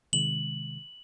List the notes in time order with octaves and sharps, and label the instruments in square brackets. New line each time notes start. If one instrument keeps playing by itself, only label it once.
[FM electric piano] C3 D#3 G#3 [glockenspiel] F#7